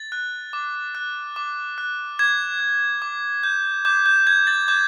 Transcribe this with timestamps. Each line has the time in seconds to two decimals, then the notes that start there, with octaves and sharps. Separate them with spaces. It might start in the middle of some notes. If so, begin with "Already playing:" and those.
Already playing: A6
0.12 F#6
0.53 D6
0.95 F#6
1.36 D6
1.78 F#6
2.19 D6 G#6
2.60 F#6
3.02 D6
3.43 G6
3.85 D6 G6
4.06 G6
4.27 G6 G#6
4.47 A6
4.68 D6 G6